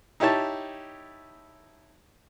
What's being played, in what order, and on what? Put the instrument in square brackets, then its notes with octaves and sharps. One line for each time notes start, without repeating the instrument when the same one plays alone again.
[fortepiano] D#4 E4 G4 C#5 A5